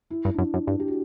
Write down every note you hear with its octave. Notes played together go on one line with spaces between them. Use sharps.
E4
G2
D4
F#2 E4
F#2
G2 D4
G4
F#4